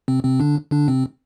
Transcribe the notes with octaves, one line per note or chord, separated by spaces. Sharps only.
C3 C4
C3 C4
D3 D4
D3 D4
C3 C4